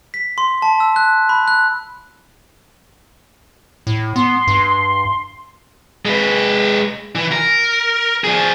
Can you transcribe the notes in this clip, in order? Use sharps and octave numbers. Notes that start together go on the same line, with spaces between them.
B6
C6
A5
E6
F#6
B5
F#6
A2
B3 C6
G2
G#3 B4
E3
A#4
F3 G#4